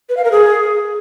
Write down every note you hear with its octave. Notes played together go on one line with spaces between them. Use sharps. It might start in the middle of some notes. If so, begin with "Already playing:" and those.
B4
F5
A#4
G#4